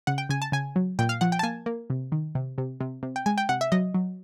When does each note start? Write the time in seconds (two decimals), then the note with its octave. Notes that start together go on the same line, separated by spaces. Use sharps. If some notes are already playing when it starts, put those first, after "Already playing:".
0.07 C#3 F#5
0.18 G5
0.29 C#3 G#5
0.42 A5
0.52 C#3 G#5
0.76 F#3
0.99 A#2 G5
1.09 F5
1.21 F3 F#5
1.32 G5
1.39 A5
1.43 A#3 G#5
1.66 A#3
1.90 C3
2.12 D#3
2.35 C3
2.58 C3
2.80 C3
3.03 C3
3.16 G5
3.26 G#3 G#5
3.38 G5
3.49 C3 F#5
3.61 E5
3.72 F#3 D#5
3.94 F#3